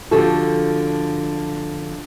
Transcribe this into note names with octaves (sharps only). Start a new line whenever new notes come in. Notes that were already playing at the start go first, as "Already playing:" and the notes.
D3 F3 F#4 G4 A4